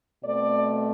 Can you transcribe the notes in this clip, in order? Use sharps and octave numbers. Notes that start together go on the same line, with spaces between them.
B2 A3 C4 D5